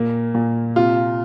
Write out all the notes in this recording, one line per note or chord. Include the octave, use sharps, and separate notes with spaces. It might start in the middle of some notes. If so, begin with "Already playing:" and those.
Already playing: A#2 A#3
A#2
C3 F4